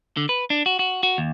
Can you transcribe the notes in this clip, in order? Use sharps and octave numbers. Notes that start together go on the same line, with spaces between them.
D3
B4
D4
F#4
F#4
F#4
D#2